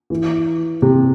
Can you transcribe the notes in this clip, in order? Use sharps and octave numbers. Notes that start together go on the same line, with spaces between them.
E3
C3